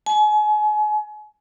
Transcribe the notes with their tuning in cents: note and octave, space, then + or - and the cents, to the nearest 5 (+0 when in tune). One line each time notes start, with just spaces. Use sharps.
G#5 +35